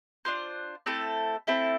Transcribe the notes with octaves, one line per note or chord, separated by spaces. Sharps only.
D4 F4 C5
A3 C4 E4 A4
A3 C4 E4 A4